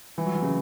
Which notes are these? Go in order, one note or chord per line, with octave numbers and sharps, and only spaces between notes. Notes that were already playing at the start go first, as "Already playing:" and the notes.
E3
F#3
E3
C#3